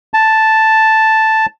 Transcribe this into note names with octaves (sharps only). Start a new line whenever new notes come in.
A5